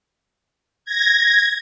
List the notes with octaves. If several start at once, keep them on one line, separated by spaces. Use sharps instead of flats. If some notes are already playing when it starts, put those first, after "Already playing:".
G#6 A#6